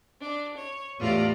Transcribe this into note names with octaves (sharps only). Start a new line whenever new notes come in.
D4
C#5
E2 A2 F4 G4 D5 A#5